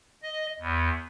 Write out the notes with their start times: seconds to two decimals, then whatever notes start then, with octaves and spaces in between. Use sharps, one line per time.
0.23 D#5
0.60 E2